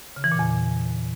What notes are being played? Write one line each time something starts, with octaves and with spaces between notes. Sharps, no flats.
C#3
E3
A#2
E2